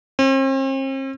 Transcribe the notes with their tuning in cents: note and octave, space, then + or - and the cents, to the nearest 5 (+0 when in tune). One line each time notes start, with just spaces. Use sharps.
C4 +45